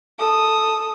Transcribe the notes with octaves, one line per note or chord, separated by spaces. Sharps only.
A4 D#6